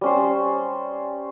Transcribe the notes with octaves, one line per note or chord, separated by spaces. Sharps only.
G3 C#4 C5